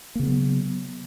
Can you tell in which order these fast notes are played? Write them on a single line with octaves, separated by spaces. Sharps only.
A#3 C#3 B3 F#3